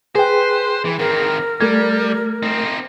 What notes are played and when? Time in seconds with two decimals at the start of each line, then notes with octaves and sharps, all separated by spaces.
0.15 G#4 B4 C5 G5
0.85 E3
0.99 D#3 C4 A#4
1.61 G3 A3 A4 G#6
2.43 C4 D#4